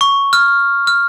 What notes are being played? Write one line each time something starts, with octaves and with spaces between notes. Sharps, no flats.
C#6
F6
F6